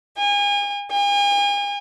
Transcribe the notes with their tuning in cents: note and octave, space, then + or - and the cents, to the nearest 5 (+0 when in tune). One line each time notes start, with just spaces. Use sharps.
G#5 -35
G#5 -40